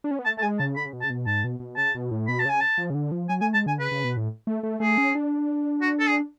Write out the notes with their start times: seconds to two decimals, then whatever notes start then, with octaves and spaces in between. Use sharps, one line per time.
0.04 D4
0.11 C#4
0.19 B3
0.25 A3 A5
0.37 A3 A5
0.42 G#3 G#5
0.59 C#3 A5
0.76 D3 B5
0.86 C#3
0.93 B2
1.01 C#3 A5
1.10 B2
1.26 G#2 A5
1.44 B2
1.60 B2
1.77 C#3 A5
1.95 B2
2.11 A2
2.28 B2 B5
2.39 A5
2.45 C#3 G#5
2.60 A5
2.78 F3
2.90 C#3
2.95 D3
3.12 F3
3.29 F#3 G#5
3.41 A3 G#5
3.54 G#3 A5
3.66 D3 G#5
3.79 C#3 B4
3.92 C#3
4.04 B2
4.17 A2
4.47 A3
4.63 A3
4.80 A3 G#4
4.98 C#4
5.15 D4
5.81 F#4
6.00 A4
6.08 G#4